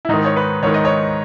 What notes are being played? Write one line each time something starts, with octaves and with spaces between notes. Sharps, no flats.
E4
G#2 D#3 D#4
C#5
B4
G#2 D#3 C#5
D#5
C#5